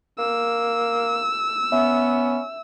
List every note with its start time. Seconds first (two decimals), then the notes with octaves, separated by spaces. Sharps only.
0.19 A#3 E6
1.72 B3 C#4 E5